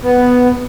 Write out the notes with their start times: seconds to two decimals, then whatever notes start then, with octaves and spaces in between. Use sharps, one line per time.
0.03 B3